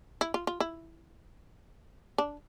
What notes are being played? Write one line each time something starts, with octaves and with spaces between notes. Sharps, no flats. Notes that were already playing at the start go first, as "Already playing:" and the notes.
E4
F4
F4
E4
D4